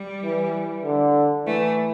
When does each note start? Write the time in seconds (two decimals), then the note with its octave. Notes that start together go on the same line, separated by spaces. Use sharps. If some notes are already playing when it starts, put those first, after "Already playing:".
Already playing: G3
0.23 E3
0.84 D3
1.46 E3 A3